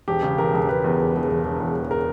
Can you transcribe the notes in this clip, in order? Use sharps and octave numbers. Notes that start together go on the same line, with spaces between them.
E1 G4
C#3
E1 A#4
E1
E1 B4
E2
E1
E1
E1
E1
E2
E1
A#4